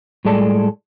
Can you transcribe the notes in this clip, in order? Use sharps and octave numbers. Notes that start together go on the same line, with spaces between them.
A2 G3 G#3 A4 D5 A5